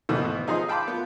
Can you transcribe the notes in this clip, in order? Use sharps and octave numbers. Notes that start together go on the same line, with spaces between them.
G#1 D#2 B2 E3 A3 B3
F3 D#4 G#4 D#5 C6
F5 G5 A5 B5 C6 D6
B3 F4